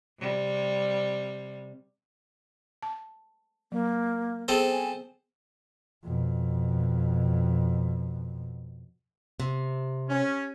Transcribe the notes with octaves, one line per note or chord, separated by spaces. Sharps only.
C3 G3
A5
F#3 A#3
B3 C4 G#4 A4 C5 D#5
G#5
F2 B2
C3
C#4